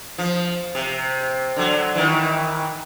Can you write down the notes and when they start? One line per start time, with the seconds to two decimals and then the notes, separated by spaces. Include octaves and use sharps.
0.18 F3
0.75 C3
1.56 D3 F#3
1.95 D#3 E3